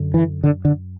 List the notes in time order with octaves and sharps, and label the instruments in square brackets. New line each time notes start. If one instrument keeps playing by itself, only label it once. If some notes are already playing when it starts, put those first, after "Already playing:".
Already playing: [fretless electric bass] F#2 D3
E3
D3
D3